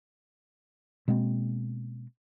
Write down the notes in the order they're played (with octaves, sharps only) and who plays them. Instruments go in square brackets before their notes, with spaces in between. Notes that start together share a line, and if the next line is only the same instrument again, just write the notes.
[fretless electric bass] B2 G#3 A#3 C4